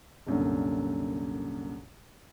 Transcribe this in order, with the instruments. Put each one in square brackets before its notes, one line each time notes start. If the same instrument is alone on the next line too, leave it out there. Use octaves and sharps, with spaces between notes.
[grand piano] C2 F#2 A#2 D3